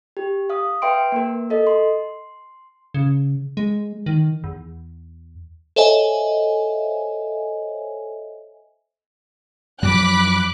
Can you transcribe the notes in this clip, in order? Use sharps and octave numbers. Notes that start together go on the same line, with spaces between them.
G4
F5 D#6
B4 E5 G5 C6 D7
A#3 A#4
A4 D#5
C6
C#3
G#3
D#3
E2
A4 C5 C#5 D#5 E5 G#5
F#2 F3 F#3 B5 D6 F#6